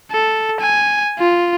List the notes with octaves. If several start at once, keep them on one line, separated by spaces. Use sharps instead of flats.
A4
G#5
F4